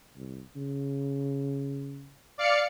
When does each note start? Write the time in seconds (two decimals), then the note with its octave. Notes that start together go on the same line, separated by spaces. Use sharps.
0.16 C2
0.56 C#3
2.38 D5 F5 C#7